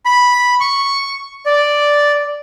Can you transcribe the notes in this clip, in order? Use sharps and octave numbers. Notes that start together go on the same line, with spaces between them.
B5
C#6
D5